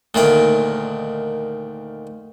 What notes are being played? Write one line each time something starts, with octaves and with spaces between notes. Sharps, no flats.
D2 A#2 D#3 G5